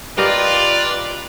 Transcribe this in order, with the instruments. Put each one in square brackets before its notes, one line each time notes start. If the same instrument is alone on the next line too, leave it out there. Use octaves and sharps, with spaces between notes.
[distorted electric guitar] F4 [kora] G4 A#4 D#5 [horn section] B4 D5